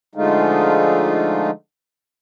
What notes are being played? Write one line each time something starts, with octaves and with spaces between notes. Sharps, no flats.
D3 F3 G#3 A3 D#4 F4